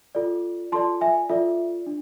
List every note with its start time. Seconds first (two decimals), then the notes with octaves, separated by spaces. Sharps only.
0.15 F4 A4 D5
0.72 F4 A4 D5 A5 C6
1.01 E5 G#5
1.29 F4 A4 D5 E5
1.87 D4